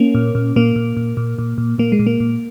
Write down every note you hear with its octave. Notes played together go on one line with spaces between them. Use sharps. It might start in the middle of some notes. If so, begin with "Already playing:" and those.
Already playing: A#3 C#4
A#2
A#2
A#2 A#3
A#2
A#2
A#2
A#2
A#2
A#2 A#3
G#3
A#2
A#3
A#2